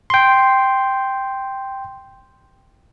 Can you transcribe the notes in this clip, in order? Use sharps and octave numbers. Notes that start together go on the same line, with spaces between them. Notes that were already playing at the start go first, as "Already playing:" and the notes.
G5 C6